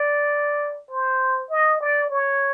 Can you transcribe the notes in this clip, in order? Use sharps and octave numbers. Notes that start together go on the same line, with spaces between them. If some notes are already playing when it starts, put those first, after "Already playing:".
Already playing: D5
C5
D#5
D5
C#5